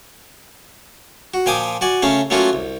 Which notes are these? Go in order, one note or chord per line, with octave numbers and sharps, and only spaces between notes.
F#4
A#2 F3 G5 G#5 D6 D#6
F#4 D5 G#5
C#3 A3 C#4 F5
F#3 A3 A#3 C#4 F4 F#4
C2